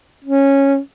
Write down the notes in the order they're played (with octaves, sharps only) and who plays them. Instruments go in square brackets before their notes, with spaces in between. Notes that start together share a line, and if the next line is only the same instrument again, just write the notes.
[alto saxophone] C#4